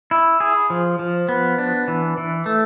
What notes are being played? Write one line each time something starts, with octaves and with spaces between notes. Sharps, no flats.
E4
G#4
F3
F3
B3
D4
E3
E3
A3